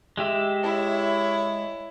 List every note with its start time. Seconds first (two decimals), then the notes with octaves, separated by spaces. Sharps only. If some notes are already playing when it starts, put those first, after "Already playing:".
0.17 G#3 G4 E5
0.62 E4 C#5